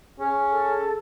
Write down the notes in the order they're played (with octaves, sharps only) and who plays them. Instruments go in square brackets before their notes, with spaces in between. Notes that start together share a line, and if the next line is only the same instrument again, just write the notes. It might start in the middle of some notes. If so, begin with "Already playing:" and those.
[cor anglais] C#4 [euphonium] G#4
[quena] A4